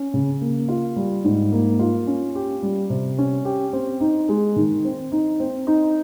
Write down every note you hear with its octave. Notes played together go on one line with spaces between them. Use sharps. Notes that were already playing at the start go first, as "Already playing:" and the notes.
Already playing: C#4
C#3
A#3
F4
G3
G#2
A#3
F4
C#4
G4
G3
C3
C#4
G4
C4
D#4
G#3
D#3
C4
D#4
C4
D#4